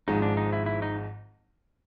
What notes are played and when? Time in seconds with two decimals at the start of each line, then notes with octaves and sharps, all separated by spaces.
0.08 G#1 G#2 F3 G#3 D#4
0.22 D4
0.37 D#4
0.53 E4
0.66 E4
0.82 D#4